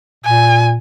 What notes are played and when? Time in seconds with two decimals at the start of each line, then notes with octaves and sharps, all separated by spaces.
0.24 A#2 G#5